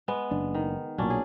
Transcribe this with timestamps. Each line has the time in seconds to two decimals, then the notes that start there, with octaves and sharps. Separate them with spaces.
0.08 G#3 B3
0.31 F#1 D4
0.54 D#3
0.98 B1 A#2 F#3 C#4 D4
1.10 G#4